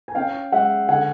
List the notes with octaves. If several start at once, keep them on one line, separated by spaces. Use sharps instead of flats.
G#5
C#4 F5 G5
G#3 E5 F#5
D3 F#5 G#5